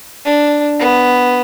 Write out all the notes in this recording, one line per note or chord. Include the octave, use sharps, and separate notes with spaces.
D4
B3